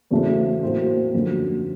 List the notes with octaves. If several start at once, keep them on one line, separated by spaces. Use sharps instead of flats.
E2 C#3 F#3 A3 C4
A2 F#3 A#3 C4 C5
F#2 D3 F3